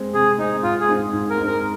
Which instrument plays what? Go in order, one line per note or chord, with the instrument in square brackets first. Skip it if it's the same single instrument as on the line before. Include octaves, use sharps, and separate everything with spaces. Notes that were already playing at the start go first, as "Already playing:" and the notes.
Already playing: [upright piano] G#3 C4
[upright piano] C3 [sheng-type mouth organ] G#4
[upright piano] G#3 C4 [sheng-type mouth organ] D#4
[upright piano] G#2 [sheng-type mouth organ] F4
[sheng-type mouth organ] G#4
[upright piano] G#3 C4 D#4
G#2
[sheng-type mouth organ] A#4
[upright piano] G#3 C4 D#4
[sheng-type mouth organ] A#4